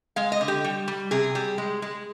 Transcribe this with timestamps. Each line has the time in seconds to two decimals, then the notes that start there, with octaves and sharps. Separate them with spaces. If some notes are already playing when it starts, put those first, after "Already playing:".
0.16 G#3 F5
0.32 D#5
0.41 D3
0.48 G4
0.64 G3
0.88 G3
1.11 C3 G#4
1.35 G3
1.58 G#3
1.82 G#3